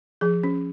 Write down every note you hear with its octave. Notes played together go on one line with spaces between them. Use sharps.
F3 G#4
C#4